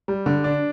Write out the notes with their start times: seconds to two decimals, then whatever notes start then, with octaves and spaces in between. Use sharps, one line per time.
0.08 G3
0.26 D3
0.44 D4